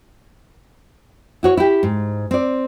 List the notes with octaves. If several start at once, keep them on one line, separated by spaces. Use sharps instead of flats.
E4 F#4 C#5
E4 G4
G#2
C4 D5